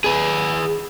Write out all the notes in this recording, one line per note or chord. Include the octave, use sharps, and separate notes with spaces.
G#4 B4